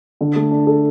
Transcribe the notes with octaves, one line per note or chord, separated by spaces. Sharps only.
D3
A3
D4
A4